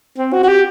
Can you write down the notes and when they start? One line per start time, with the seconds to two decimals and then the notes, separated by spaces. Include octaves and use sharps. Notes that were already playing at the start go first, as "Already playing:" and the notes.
0.18 C4
0.33 F#4
0.43 F#4
0.48 G4